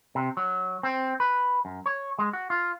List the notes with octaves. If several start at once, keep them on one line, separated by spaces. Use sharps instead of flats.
C3
F#3
C4
B4
F#2
C#5
G#3
F#4
F4